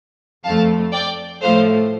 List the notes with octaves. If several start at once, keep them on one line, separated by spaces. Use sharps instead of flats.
F2 F3 A3 F5 A5
D5 G5
A2 F3 A3 C5 F5